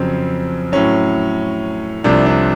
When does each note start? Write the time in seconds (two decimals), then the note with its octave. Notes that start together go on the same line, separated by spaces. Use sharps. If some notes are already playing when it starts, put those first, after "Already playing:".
Already playing: F2 C#3 F#3 C4
0.72 A2 F#3 C#4
2.04 C2 C3 F3 D4
2.26 D4